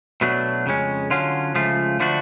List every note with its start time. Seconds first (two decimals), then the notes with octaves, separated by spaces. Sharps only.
0.21 B2 F#3 A3 D4
0.66 F2 C#3 G#3 C#4
1.10 D3 F#3 C#4 F4
1.54 C#2 C#3 F3 A3 F4
2.00 D3 F3 A3 D4 F#4